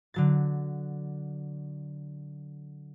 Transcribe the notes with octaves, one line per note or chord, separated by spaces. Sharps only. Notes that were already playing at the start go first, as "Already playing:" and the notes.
D3 F#3 A6